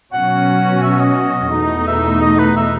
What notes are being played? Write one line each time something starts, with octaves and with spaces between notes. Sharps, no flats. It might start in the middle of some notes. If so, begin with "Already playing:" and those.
B2 F#3 C#4 F#4 F#5
E5
D#5
E2 B2 A3 D#4
E5
D#5
B4
E5